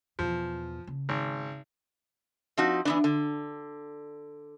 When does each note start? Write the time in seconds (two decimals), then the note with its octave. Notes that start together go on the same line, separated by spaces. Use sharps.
0.19 E2 B2 F3
0.87 C#3
1.09 G#1
2.57 F3 C4 D#4 F#4
2.85 E3 B3 D4
3.04 D3